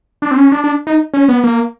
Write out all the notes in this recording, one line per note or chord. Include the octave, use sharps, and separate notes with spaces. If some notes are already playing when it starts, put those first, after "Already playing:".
D4
C4
C#4
D4
D4
D#4
C#4
B3
A#3